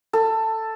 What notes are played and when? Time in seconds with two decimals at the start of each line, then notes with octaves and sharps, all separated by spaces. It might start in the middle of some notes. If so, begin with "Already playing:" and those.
0.13 A4